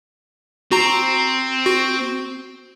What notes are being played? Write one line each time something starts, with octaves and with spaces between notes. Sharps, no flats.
C4 F#4 A#5
F#4